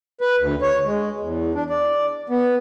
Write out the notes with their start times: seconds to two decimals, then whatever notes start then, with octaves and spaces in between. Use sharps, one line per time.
0.21 B4
0.39 D2
0.62 C#5
0.85 G#3
1.20 E2
1.55 D4
1.70 D5
2.29 B3